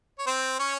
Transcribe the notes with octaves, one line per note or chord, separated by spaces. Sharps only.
C#5
C4 C5
C#4 C#5